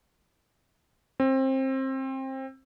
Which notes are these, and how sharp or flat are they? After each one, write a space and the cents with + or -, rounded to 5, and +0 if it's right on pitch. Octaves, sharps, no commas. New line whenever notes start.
C4 +25